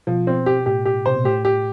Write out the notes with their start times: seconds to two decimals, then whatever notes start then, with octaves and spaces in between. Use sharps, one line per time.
0.07 B2 F3
0.27 C4
0.46 G4
0.66 A2 G4
0.85 G4
1.06 C3 C5
1.16 B2
1.24 A2 G4
1.45 G4